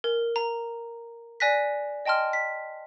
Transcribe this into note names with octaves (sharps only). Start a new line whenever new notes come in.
A#4
A#5
D5 G#5 F#6 A#6 B6
D#5 G5 A5 C6 F6
B6